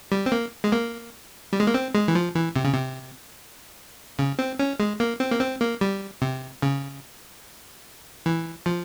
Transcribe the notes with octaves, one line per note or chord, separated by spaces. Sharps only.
G3
C4
A#3
G#3
A#3
G3
G#3
A#3
C4
G#3
E3
F3
E3
C3
C#3
C3
C#3
C4
C#4
G#3
A#3
C4
A#3
C4
A#3
G3
C3
C#3
E3
F3